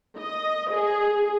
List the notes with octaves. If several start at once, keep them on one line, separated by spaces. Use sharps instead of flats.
D#5
G#4